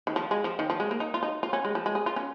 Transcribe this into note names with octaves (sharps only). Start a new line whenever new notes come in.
D#3
F3
G#3
F3
D#3
F3
G#3
A#3
D#4
F4
D#4
F4
C#4
G#3
F3
G#3
G#4
F4
C#4